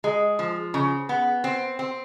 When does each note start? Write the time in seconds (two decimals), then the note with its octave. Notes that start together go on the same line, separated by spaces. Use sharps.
0.04 G#3
0.39 F3
0.74 C#3
1.09 B3
1.44 C4
1.79 C4